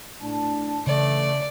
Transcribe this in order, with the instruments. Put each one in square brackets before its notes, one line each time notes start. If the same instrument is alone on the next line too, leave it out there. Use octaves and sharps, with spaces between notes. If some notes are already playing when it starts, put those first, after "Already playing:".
[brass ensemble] A2 D4 A5
[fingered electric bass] C#3 [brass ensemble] E3 A3 [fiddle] D5